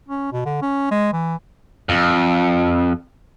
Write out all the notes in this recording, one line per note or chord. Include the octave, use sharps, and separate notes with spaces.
C#4
B2
D3
C#4
G#3
E3
F2